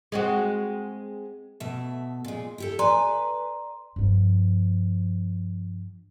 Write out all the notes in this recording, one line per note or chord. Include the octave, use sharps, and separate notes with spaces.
G#3 C4 F#4
B2 A3 E5
A#2 G#3
E4 G4 A4
B4 D5 G#5 A#5 C6
G2 F3